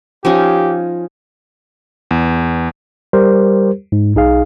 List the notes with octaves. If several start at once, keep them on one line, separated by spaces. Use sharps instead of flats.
F3 C#4 D#4 G4
E2
G3 G4 A#4 C5
G#2
B1 D#4 G#4 F5